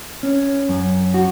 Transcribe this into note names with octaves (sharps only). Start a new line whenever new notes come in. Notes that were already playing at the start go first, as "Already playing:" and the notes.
C#4
F#2
F#4